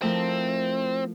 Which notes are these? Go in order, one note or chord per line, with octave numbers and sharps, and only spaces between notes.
F3 A3 C4 E4 A#4